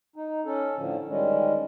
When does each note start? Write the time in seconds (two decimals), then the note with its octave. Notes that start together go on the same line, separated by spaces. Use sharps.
0.16 D#4
0.45 C#4 A4
0.77 A2 D3 F3
1.08 D#3 G3 G#3 C#4